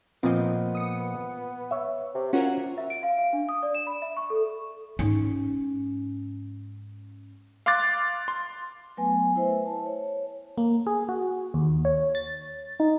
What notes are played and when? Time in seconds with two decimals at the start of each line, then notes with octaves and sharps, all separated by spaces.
0.23 A#2 F3 B3 C4 D#5
0.75 D#6 C#7
1.71 C#5 E5
2.15 C3
2.33 C#4 F4 F#4 A#4
2.78 E5
2.90 D7
3.03 F5
3.18 F5
3.33 D4
3.49 D#6
3.63 D5
3.75 E7
3.87 B5
4.02 E5
4.17 C#6
4.30 A4
4.99 G#2 C#4
7.66 F5 C6 D6 F#6 A6
8.28 C6
8.97 F#3 A3 B3 B4 G#5
9.36 E4 C5 E5
9.66 A5
9.86 C#5
10.58 A#3
10.87 G#4
11.09 F#4
11.54 D#2
11.85 C#5
12.15 A6
12.80 D#4